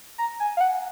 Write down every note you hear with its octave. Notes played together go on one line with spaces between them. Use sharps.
A#5
G#5
F5
F#5